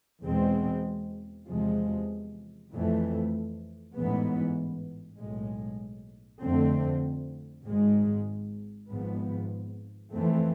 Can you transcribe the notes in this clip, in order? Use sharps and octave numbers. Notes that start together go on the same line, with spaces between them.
E2 B2 G#3 C4
E2 C3 F3 G#3
F2 E3 A3
A1 G#2 E3 B3
B1 A2 G#3
F2 D3 A3 C4
G#1 G#2 G#3
G#1 G#2 F3 B3
F2 E3 A3 C4